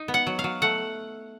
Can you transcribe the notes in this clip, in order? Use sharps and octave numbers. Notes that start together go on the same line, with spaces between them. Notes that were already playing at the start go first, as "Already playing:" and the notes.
Already playing: D#4
B3
F#5
F#3
F5
F#3
A3 F#5